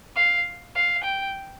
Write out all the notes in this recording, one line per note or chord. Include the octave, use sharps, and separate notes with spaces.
F5
F5
G5